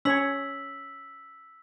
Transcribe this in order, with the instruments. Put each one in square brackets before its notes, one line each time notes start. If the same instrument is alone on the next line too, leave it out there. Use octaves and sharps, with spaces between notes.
[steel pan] C#4 C#5 [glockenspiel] E6 B6 F#7